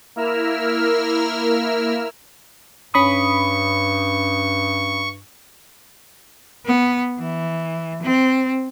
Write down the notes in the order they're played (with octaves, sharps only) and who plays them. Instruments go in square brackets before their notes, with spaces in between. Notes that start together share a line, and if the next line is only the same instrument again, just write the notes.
[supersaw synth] A#3 E4 A#4 E6 F6
[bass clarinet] G2 [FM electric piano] C#4 B5 D#6 [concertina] C#6
[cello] B3
E3
C4